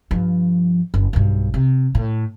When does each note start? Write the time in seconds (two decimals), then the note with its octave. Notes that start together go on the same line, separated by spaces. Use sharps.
0.11 G2 F3
0.94 F#1
1.13 B1 G2
1.54 C3
1.95 A2